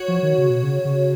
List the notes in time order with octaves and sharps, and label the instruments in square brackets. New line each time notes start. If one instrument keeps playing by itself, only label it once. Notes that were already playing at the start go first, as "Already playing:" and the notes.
Already playing: [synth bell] F#4 C#5
[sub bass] F3
D#3
C#3
B2
C#3
C#3